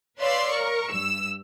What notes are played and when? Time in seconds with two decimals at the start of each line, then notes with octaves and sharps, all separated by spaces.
0.19 B4 C#5 D5 F5 C6 E6
0.51 A#4 C#6
0.90 G2 E6